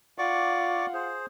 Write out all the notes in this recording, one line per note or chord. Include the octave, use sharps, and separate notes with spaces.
F4 D5 F#5 C#6 D6
G#4 C5